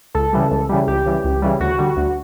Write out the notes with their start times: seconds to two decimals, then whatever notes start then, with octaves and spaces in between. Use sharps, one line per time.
0.14 C#2 A4
0.33 C#3 E3 G3
0.51 C#2
0.69 C#3 E3 G3
0.87 C#2 G4
1.06 C#3 E3 G3
1.24 C#2
1.42 C#3 E3 G3
1.60 D2 F#4
1.78 D3 G3
1.97 D2